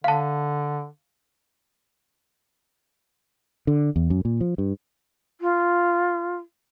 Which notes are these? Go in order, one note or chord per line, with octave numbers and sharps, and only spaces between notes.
D3 F5 A5
D3
E2
F#2
A#2
F3
G2
F4